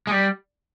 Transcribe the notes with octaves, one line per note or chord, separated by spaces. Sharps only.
G#3
G3